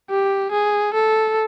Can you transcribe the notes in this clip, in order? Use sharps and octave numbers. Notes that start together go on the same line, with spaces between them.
G4
G#4
A4